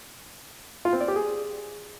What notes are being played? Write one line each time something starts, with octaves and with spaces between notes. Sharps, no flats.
F4
C4
D5
G4
G#4